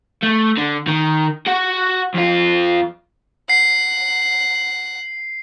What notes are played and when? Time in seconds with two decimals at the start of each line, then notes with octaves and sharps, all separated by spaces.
0.23 A3
0.57 D3
0.87 D#3
1.46 F#4 F#5
2.14 F2 F4
3.50 F#5 C7